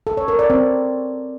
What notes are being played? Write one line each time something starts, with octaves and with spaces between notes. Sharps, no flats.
A4
C#5
A#4
D5
C4